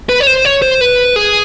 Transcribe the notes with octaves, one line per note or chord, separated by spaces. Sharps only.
B4
C#5
C5
C#5
C5
B4
G#4